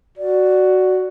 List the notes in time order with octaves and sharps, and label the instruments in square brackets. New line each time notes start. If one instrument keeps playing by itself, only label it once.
[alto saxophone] F#4 [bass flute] D5